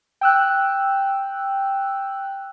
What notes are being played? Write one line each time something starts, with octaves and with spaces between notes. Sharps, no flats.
G5 E6 F#6